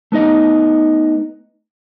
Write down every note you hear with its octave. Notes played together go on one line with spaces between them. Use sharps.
A3 B3 D#4 D#5